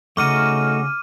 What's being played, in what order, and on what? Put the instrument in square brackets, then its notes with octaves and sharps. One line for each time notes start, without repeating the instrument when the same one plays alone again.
[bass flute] C#3 [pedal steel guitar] A3 D#4 F#4 [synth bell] D6 F6 D#7